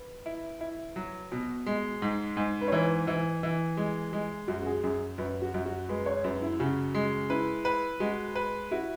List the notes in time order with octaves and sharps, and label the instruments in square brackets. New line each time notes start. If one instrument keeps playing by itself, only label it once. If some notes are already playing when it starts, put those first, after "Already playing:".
Already playing: [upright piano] B4
[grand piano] E4
E4
F#3
B2
G#3
G#2
G#2
[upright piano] B4
C#5
[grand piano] E3 [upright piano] B4
[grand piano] E3
E3
G#3
G#3
[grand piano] F#2 [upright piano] F#4
[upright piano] F#4
G#4
[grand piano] F#2 [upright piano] G#4
[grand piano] F#2 [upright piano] B4
[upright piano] F#4
[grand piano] F#2
[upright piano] F#4
[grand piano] G#3 [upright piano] B4
[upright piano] C#5
[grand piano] F#2 [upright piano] B4
[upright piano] E4
[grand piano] C#3 [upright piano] F#4
[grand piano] G#3
[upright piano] E4 [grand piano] B4
[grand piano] B4
[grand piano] G#3 [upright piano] F#4
[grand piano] B4
[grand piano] E4 [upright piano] F#4